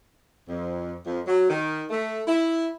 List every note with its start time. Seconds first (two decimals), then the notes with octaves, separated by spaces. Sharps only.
0.48 F2
1.06 F2
1.27 F#3
1.50 D#3
1.90 A3
2.27 E4